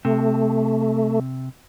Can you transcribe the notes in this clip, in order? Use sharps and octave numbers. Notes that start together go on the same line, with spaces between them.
C3 A3